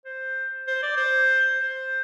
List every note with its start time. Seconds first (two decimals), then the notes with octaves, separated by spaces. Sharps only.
0.05 C5
0.67 C5
0.83 D5
0.97 C5
1.59 C5